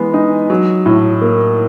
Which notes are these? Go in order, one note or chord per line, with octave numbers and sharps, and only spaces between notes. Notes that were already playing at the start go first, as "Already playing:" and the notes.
Already playing: E3 G#3 B3
D#4
F#3
A2
A#3